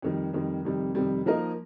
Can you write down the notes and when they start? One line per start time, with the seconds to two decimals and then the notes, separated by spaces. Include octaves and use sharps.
0.02 F2 D#3 G3
0.33 F2 D#3 G3
0.65 F2 C3 D#3 G3
0.95 F2 C3 D#3 G3
1.26 F3 A#3 D#4 A#4 D#5